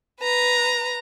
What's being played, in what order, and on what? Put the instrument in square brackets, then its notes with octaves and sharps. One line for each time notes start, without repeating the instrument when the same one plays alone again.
[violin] B4 A#5